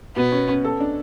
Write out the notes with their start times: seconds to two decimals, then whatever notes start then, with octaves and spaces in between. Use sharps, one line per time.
0.16 B2 B3
0.32 C#4
0.49 C#4
0.64 A4
0.80 D4